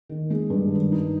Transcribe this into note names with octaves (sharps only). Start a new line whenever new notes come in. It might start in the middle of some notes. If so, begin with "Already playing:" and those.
D#3
G#3
G2
D#3
D#4